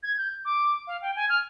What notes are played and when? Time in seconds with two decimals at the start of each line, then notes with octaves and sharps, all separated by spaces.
0.03 G#6
0.18 G6
0.45 D6
0.87 F5
1.02 G5
1.16 G#5
1.29 F6